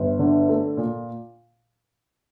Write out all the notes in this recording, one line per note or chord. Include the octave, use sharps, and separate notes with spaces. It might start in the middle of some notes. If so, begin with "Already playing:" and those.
Already playing: G1
D3
A3
A#2